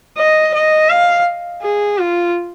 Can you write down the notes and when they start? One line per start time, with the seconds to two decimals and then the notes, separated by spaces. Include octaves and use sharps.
0.17 D#5
0.54 D#5
0.89 F5
1.62 G#4
1.98 F4